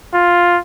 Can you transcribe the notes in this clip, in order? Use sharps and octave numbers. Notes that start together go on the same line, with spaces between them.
F4